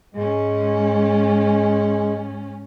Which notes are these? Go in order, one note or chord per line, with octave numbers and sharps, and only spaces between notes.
G#2 G#3 C#4